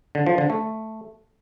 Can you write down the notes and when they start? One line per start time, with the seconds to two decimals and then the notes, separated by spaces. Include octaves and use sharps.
0.15 D3
0.27 F3
0.38 D3
0.50 A3